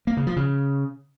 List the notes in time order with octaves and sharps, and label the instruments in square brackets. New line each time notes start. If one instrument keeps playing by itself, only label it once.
[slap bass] A#3
C#3
F3
C#3